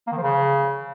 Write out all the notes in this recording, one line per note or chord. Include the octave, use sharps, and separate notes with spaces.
A#3
D#3
F3
C#3